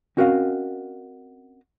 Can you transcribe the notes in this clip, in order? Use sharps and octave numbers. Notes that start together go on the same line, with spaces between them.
C4 C#4 F#4 A#4 D#5 F5